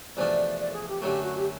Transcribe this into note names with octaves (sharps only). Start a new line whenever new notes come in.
E2 C3 F3 A3 D4 D5
D5
G#4
G4
F#2 D3 F#3 A3 G4
F#4
G4